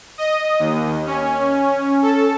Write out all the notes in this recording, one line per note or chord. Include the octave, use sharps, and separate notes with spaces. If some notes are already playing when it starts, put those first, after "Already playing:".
D#5
D#2
C#4
A4